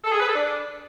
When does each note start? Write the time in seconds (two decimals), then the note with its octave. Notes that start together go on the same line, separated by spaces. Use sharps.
0.04 A4
0.12 G#4
0.20 B4
0.28 A4
0.35 D4